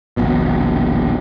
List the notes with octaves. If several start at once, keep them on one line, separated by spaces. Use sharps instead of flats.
D#1 A#1 B2